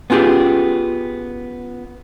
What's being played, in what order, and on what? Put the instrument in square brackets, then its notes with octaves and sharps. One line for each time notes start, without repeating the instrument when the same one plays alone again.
[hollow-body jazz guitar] B3 C#4 F4 G4 G#4